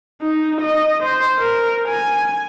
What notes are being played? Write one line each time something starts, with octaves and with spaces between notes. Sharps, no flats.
D#4
D#5
C5
A#4
G#5